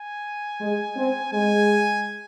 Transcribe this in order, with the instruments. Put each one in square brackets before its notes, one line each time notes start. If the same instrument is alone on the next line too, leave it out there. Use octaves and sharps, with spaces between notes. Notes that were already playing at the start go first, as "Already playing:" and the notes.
Already playing: [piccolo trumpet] G#5
[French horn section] G#3
C4
[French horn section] G#3 [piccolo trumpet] G#5